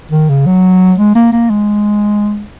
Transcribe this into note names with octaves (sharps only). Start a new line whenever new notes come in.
D#3
C#3
F#3
G#3
A#3
A#3
G#3